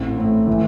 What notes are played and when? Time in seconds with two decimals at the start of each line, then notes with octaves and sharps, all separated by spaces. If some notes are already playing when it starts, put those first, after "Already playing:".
Already playing: A1 C4
0.18 A2
0.47 E3